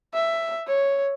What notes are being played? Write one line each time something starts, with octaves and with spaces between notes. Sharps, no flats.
E5
C#5